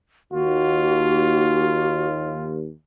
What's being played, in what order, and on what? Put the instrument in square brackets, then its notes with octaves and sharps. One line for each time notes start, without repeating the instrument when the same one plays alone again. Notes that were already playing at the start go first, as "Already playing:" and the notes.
[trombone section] D#2 [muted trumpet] F4 [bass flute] F#4